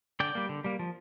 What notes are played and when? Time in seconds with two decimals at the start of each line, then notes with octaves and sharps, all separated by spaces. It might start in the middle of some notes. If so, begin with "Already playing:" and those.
0.20 D3 D5 G5
0.35 G3 A#3
0.49 D3
0.64 G3 A#3
0.79 F3